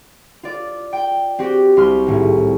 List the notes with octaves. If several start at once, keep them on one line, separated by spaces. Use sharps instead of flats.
F4 D5
G5
C4 F#4 G4
C2 C6 F6
G#1 A2